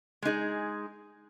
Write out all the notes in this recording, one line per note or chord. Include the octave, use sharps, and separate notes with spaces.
G#3 D#4 G#4